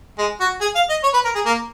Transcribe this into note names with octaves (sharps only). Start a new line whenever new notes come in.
G#3
F#4
G#4
F5
D#5
C#5
B4
A#4
G#4
A#3